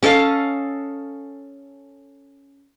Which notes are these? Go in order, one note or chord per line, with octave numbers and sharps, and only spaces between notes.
C#4 A4 D#5 F5